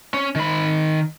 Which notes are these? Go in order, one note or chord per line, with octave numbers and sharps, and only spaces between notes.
C#4
D#3 B5